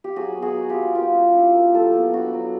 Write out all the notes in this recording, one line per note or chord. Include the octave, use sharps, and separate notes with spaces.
G4
F#3 F#4 G#4
B3
F#4 G#4
D#4
F4 G4
F#3
A#3 F4 G4
C#4
E4
A#3
F#3 G4 A4
B3
D4 F#4
F#3